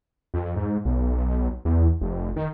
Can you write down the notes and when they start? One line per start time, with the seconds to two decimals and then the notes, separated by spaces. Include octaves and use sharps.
0.34 F2
0.56 G#2
0.85 B1
1.65 E2
2.01 F1
2.36 D#3